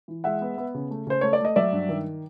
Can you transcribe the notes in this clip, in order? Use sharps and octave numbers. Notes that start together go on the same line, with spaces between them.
E3
G#3 E5 F#5
B3
B3
C#3
A3
C#3 C5
A3 C#5
D5
A3 D#5
F#3 D5 E5
G2
D#3